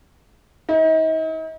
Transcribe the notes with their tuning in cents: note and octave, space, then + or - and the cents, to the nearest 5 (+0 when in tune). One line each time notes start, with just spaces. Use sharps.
D#4 +40